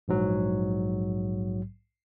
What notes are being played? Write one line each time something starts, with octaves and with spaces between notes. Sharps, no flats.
A#1 G#2 F#3